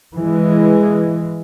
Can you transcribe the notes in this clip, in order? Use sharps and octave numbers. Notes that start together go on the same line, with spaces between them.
E3 G#3